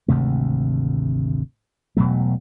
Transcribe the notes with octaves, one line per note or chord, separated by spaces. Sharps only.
G#1 D2 C3 A3
E1 B2 F#3 A3